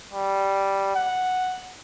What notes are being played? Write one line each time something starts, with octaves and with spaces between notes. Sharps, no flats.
G3
F#5